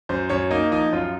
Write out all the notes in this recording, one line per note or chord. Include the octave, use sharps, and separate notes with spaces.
F#2 C5
F#2 C#5
A#3 D#4
F3 D#4
F#2 F4